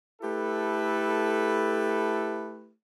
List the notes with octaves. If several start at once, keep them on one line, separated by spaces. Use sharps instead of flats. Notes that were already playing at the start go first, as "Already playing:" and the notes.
A3 E4 G4 A4 B4